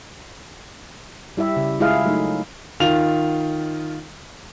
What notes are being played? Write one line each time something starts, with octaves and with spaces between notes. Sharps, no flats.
G3 E4 G4 E5
C#3
G#3 E4 F4 G#4 D#5 F5
F#3 A3 D#4
D#3 F4 F7